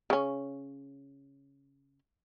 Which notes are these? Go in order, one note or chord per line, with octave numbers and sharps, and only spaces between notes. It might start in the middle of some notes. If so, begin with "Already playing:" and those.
C#3 C#4